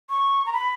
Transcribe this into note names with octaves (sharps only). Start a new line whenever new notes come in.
C#6
A#5
B5